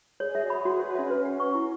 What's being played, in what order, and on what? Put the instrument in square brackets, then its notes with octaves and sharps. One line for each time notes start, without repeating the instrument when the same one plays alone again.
[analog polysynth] G#4 [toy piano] C#5
[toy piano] E5
[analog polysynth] F#4
[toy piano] B5
[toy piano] F#4 [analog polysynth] G#4
[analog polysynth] B4 [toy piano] C#5
[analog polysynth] G#4
[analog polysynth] C#4 [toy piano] E5
[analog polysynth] C#4 [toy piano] B4
[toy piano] F#5
C#6
E4